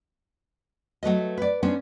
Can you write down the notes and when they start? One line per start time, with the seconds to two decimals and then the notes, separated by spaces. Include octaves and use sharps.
1.03 F#3 A3 B4 D#5
1.38 B4 D5
1.63 B3 C#4 D4 C5